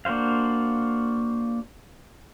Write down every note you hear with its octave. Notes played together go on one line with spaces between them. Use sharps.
A#3 D4 F#4 C5 F5